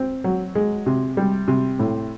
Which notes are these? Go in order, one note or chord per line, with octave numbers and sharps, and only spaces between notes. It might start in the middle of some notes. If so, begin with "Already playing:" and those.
Already playing: C4
F#3
G#3
C3
G3
C3
A2